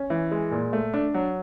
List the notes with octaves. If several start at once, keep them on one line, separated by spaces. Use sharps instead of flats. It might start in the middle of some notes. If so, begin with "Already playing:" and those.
Already playing: C#4
E3
G#3
A#2
A3
D4
F#3